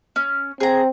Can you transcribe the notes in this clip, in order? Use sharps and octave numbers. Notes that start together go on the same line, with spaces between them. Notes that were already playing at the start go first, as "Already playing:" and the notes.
C#4
C4 G#4 A#5